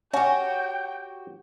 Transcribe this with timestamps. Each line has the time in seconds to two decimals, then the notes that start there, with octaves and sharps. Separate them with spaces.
0.13 C#4 F#4 G4 G5